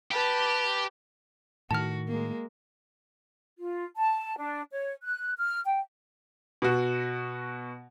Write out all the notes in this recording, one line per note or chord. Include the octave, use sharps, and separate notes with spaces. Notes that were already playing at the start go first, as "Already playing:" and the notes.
G4 B4 A5
A2 D#3 F#4 A5 F6
G#3 A#3
F4
A5
D4
C#5
F#6
F6
G5
B2 F#4